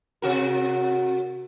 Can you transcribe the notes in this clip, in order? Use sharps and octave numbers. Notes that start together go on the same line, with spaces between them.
C3 F#4 A#4